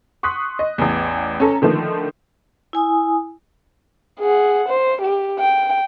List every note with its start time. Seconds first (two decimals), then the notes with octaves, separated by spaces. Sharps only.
0.23 C6 C#6 D#6 F#6 B6
0.59 D#5
0.78 A1 E2
1.40 C#4 A4 A#5
1.62 D3 D#3 F3 A3
2.73 E4 G#5 D#6
4.20 G#4 F#5
4.68 C5
5.01 G4
5.39 G5